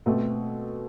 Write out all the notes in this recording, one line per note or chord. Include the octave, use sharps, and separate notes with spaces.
B2 A3 C4